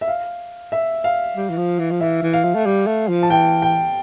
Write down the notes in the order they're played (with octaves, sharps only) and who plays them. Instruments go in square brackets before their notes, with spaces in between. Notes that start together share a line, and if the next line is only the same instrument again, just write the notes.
[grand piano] E5
F5
E5
F5
[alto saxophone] G3
E3
F3
E3
F3
[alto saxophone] E3 [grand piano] E5
[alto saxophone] E3
[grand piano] F5
[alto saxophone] F3
A3
G3
A3
F3
[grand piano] A5
[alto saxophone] E3 [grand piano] G5
[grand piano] G5